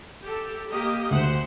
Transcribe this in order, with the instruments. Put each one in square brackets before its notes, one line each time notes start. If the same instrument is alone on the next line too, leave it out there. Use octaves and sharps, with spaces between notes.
[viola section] G4 A4
A#3 G4 D#5
[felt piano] D2 [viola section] G4 C5 F#5